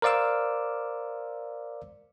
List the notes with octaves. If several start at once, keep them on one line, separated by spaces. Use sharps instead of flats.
A#4 C5 D5 F5 D6 E6